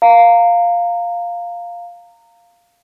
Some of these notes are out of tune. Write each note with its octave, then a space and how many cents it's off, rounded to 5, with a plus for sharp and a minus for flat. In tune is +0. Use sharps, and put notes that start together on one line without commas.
F5 +0 A#5 -20